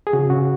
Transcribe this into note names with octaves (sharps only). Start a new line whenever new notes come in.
G#4
C#3 F#4
C#3 F#4